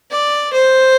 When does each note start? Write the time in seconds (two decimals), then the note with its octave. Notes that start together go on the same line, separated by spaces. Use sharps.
0.11 D5
0.53 C5